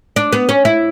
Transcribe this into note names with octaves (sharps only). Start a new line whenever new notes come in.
D4
B3
C#4
E4